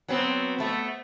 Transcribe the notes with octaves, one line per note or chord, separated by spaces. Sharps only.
F#3 B3 C4
A3 B3